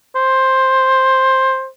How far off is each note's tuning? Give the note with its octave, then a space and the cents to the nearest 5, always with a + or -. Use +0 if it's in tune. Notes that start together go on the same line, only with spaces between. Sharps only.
C5 +10